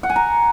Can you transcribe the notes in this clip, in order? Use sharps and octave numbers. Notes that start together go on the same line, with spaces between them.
F#5
G#5
A#5